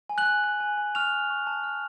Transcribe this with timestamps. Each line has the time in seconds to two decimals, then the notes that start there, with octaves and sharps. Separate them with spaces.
0.10 G#5
0.18 F#6 F#7
0.26 G#5
0.44 F#6
0.60 G#5
0.78 G#5
0.95 C#6 F6 F7
1.12 G#5
1.30 C#6
1.47 A5
1.64 F6